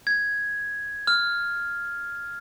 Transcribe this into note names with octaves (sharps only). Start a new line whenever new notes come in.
G#6
F6